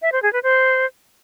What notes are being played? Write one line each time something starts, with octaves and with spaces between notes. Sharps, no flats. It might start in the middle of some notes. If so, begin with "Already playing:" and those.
E5
C5
G#4
B4
C5